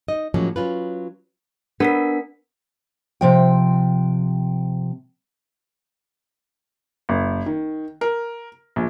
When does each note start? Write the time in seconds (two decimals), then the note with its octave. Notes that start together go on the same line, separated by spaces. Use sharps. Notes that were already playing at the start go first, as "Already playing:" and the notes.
0.08 D#4 D#5
0.34 A2 F3 F#3 G#3 A#3 C#4
0.56 F#3 C#4 F4 B4
1.80 B3 D4 A#4 B6
3.21 C3 F3 G5
7.09 F#1
7.46 D#3
8.01 A#4
8.76 A#1